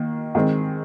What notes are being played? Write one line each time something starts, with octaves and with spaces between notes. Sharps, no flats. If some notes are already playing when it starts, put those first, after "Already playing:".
Already playing: D#3 A#3
D#3 G#3 C4